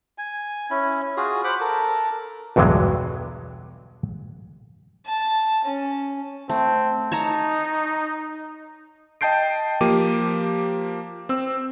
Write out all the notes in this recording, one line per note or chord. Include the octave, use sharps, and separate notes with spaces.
G#5
C#4 E4
F4 F#4 G#4
C5 F#5 B5 D6
A4 A#4
B1 E2 G2 D3 F#3 G#3
A5
C#4
A3 C4
D#4 C#5 A5 A#5
D#5 G5 A5 G6 C7 D7
F3 A#3 G4 D6 D#7
C4 E6